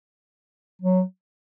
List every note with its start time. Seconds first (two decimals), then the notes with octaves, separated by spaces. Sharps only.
0.82 F#3